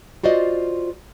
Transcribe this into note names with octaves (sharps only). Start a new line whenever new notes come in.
F4 F#4 C5 D5 D#5